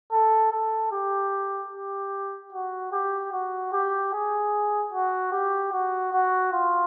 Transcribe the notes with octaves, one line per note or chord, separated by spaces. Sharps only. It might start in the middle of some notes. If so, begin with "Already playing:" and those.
A4
A4
G4
G4
F#4
G4
F#4
G4
G#4
F#4
G4
F#4
F#4
F4